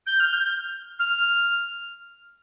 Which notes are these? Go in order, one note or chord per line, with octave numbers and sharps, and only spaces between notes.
G6
F6
G6
F6